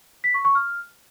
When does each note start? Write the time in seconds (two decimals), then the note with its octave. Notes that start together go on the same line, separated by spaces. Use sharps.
0.24 B6
0.34 C#6
0.45 C#6
0.55 F6